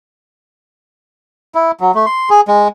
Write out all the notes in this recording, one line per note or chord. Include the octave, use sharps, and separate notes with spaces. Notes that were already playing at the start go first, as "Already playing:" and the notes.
E4
F#3
A3
C6
G#4
G#3